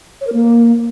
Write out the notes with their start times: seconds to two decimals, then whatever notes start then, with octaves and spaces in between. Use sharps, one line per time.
0.21 C#5
0.27 A#4
0.33 A#3